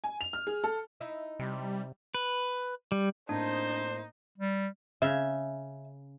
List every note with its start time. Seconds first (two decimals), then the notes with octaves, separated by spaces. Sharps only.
0.04 G#5
0.21 F7
0.33 F6
0.47 G#4
0.64 A4
1.01 D#4 E4 E5
1.40 C3 G3
2.15 B4
2.92 G3
3.29 A2 A#3 C4 D4 D#4 C5
4.38 G3
5.02 C#3 E5